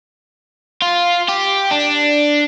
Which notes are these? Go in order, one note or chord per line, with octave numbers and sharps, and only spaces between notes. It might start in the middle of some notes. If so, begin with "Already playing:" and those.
F4
G4
D4